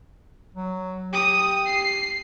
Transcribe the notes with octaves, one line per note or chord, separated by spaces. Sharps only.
F#3
G4 D#6
C7